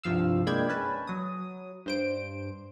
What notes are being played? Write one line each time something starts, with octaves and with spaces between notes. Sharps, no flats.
C2 G2 F3 F5 E6
G#3 A#3 D4 G5 B5 G#6
C#4 B4 A5
F#3 D#6
G2 C5 D7